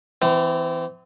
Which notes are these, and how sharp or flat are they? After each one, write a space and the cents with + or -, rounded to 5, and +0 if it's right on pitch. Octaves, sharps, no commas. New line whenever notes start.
E3 +0 C4 -35